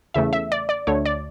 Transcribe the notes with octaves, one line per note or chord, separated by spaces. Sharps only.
E2 C#3 E3 A3 E5
E5
D5
D5
D2 D3 A3 C#5
D5